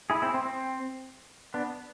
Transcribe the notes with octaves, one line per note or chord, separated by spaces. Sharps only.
E4 G#4
C4 E4
C4
C4
B3 D4